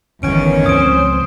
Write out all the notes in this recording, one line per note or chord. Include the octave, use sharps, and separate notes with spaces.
G1 E2 D#3 C#4 D7
C#2 F3 C4 C5 D#6 D7